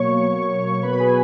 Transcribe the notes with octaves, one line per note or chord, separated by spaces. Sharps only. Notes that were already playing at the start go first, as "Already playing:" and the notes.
Already playing: B2 F#3 A#3 C#5 C#6
B2 F#3 B3 B4 B5
G#4 G#5